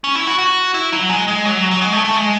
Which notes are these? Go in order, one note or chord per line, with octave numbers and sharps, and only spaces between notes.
C#4
E4
F#4
F#4
E4
F#3
G#3
G#3
F#3
F#3
G#3
A3
A3
G#3